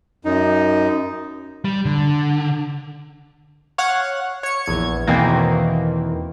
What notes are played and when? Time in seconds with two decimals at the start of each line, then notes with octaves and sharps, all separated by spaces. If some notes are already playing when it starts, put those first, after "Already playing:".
0.25 F#2 D#4
1.65 G3
1.85 D3
3.78 C#5 F5 F#5 F#6
4.43 C#5 C#7
4.66 A#1 E2 G#6
5.07 E2 B2 D#3 E3 A#3 C4